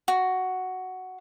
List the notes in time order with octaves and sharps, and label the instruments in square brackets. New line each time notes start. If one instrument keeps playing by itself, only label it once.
[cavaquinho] F#4